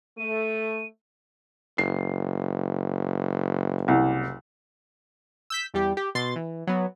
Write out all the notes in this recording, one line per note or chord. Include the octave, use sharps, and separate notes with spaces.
A3 D#7
F#1 C7
C2
E6 G6 B6
E2 G3 G4
G4
B2 C6 A6
E3
F#3 B3